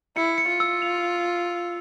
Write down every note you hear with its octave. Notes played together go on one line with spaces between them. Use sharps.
E4 C#7
C#7
F4
E6
F7